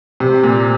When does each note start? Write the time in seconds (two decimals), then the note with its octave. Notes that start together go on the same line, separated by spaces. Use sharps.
0.20 C3
0.43 A#2